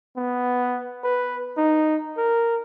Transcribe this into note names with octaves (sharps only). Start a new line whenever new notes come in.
B3
B4
D#4
A#4